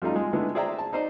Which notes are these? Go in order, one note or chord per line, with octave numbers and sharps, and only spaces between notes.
F3 G3 A3 D#4 F4
G#3
D3 G#3 A3 B3 E4
G#4 C5 D5 E5 G5 A#5
A5
D#4 C5 D5